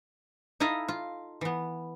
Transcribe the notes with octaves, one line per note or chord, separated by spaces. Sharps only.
D#4 E4 A4 D#5 F5
F4
E3 B3